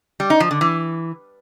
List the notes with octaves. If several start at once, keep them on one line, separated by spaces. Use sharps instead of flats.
G3
D#4
F3
D3
E3